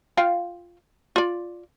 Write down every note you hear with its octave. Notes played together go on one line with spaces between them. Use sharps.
F4 F5 G5
F4 D5